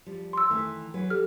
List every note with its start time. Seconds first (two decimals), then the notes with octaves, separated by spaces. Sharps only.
0.06 F3 G3
0.33 C6 E6
0.50 D#3 E3 A3
0.94 F#3 G#4 B4
1.10 G4 A4 F6